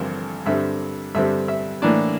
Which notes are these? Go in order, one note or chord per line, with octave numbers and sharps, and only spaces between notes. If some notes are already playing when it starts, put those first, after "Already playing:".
Already playing: A1 G2 D3 F3 C4 A4 A#4
G2 D3 G3 C4 E5
G2 D3 G3 C4 E5
E5
A2 E3 A#3 D4 D5